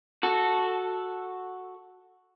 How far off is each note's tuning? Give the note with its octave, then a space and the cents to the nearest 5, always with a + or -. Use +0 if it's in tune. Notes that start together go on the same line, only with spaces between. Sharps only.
F#4 -5 A4 +0